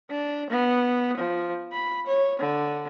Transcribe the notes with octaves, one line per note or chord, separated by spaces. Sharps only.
D4
B3
F3
B5
C#5
D3